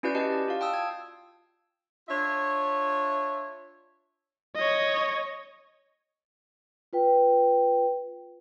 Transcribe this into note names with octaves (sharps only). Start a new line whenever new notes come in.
C#4 E4 F#4 B4 D5 G6
F#4 G4 D#5 A5
D5
F4 F5
G5 A5 D#6 E6
G#6
D4 F4 C#5 E5
C#5 D#5
F4 B4 G5